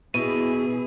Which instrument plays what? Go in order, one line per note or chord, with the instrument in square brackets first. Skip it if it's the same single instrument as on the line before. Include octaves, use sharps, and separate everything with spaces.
[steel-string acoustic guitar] B2 [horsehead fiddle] E4 G#4 [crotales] D#7